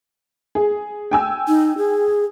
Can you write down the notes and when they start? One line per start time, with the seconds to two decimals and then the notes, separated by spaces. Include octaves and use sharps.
0.55 G#4
1.11 G5 G#5 E6
1.48 D#4
1.78 G#4